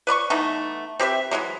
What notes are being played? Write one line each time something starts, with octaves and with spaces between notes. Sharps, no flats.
B4 D5 B5 C#6
E3 A3 B3 D#4
C4 G4 B4 E5
E3 F#3 G#3 A#3